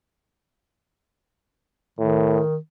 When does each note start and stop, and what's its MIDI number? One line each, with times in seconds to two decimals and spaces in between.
1.99 2.41 45
1.99 2.57 51